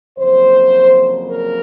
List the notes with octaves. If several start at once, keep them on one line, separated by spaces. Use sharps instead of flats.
F2 C#3 F#3 A#3 C5
A#4